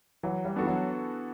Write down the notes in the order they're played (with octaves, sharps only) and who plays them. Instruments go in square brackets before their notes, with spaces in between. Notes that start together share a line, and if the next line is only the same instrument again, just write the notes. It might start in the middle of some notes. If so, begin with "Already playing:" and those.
[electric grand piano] E3 [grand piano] F#3
[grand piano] G3
[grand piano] E3 [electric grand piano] B3 D4 F#4 A4
[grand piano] F#3